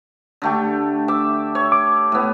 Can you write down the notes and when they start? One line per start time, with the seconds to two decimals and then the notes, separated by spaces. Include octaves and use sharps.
0.42 D3 A3 G4
1.08 E5 D6
1.55 C#5
1.72 D6
2.12 A2 B3